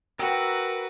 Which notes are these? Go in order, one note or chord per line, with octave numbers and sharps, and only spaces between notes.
F#4 A#4 B4 G5 E6